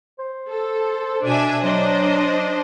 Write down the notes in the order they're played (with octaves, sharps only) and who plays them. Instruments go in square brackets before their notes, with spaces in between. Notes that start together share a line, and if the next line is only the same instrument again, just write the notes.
[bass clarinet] C5
[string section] A4
[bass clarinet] B2 [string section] D4 E5 G#5
[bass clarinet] F#3 [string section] D4 C5 D#5